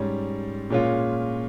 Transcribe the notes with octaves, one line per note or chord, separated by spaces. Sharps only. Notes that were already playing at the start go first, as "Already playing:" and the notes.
Already playing: G#2 G3 C#4
A#2 G#3 C#4 F4